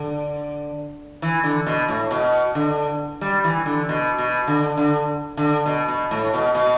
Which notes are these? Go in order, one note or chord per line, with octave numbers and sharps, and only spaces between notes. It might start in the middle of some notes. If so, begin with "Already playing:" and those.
Already playing: D3
E3
D3
B2
A2
B2
D3
G3
E3
D3
B2
B2
D3
D3
D3
B2
B2
A2
B2
B2